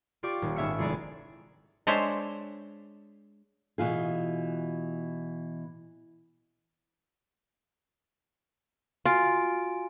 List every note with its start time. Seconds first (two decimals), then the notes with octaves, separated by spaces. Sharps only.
0.23 F4 G4 D5 G5 C#6 D6
0.42 D#1
0.56 G#1 C#4 E5 E6 C#7
0.78 F1 G#3 E4 G#4 D5 A#5
1.87 G#3 D4 C5 C#5 E5
3.78 B2 E3 F4 G#4
9.06 F4 F#4 G#5 D7